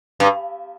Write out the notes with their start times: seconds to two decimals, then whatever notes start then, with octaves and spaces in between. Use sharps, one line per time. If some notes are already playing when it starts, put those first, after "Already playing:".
0.20 G2